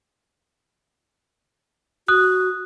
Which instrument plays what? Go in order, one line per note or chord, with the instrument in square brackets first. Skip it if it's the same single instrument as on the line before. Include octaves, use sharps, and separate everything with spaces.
[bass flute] F#4 [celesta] D#6 F#6